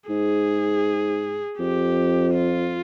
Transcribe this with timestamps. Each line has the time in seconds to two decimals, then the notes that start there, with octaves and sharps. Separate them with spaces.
0.09 G#2 G#4
1.58 F2 G4
2.34 F4